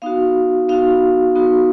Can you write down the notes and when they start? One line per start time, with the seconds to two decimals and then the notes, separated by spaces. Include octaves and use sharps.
0.02 B3 D#4 F#4 F5
0.69 B3 D#4 F#4 F5
1.35 B3 D#4 F#4